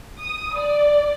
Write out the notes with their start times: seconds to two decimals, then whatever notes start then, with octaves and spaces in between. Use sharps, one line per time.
0.20 D#6
0.55 D5